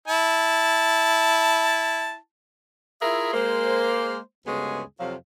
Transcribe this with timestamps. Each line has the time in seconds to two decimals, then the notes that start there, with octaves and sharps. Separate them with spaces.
0.08 E4 A5
3.02 E4 F4 G#4 A#4 E5
3.34 G#3 A#3 C5
4.46 D2 G2 C#3 G#3 B3 G#4
4.99 F2 C3 F3 F#3 F5